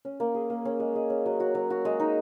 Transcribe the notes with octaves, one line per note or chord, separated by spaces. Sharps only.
C#4
A#3
G#4
A#3
C#4
G#3
G#3
C#4
F#3
F#4
F#3
F#4
G#3
D#4